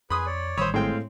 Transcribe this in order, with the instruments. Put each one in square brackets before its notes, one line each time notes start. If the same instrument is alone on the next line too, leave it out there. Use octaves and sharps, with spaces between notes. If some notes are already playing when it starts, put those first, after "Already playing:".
[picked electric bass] F2 [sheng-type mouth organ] G#4 B4 G#5 [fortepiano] B5 C6 D#6
[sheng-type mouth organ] C#5 D5
[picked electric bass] A1 D#3 G3 [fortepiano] C5 C#5 [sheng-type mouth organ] B5 D#6 E6
[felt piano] A2 [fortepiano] G#3 C4 G5 [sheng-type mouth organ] F5